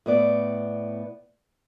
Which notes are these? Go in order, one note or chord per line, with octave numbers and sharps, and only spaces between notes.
A2 B3 D5